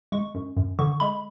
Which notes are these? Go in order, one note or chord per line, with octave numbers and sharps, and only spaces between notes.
G#3 C#6
F#2
F#2
D3 C#6
G#3 B5